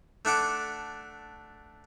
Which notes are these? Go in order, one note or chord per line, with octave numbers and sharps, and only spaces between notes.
A3 D4 F#5 D6